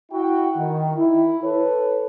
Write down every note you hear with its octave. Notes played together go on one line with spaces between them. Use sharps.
E4 F#4 G5
D#3
E4
A4 B4 C#5